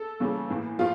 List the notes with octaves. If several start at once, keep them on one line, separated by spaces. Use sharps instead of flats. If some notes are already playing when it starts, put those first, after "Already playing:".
Already playing: A4
C#3 E3 G3 A#3
A2 E3 A#3
A2 F3 F4